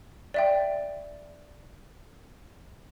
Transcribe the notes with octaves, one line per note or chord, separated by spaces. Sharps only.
D5 E5 G5